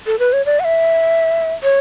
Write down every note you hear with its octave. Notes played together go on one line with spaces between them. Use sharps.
A4
B4
C#5
D5
F#5
E5
C#5